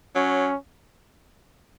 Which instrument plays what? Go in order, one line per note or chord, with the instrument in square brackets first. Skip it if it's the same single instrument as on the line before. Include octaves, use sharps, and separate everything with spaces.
[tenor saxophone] F#3 [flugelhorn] C#4